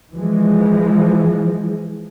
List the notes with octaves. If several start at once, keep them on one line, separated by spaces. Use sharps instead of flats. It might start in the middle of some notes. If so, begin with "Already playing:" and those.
E3 F3 G#3